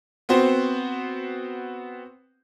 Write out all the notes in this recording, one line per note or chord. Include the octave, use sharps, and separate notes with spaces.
B3 C4 F#4 C5